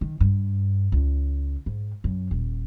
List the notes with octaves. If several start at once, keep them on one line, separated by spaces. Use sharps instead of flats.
D#3
G2
C#2
G#2
F#2
D#1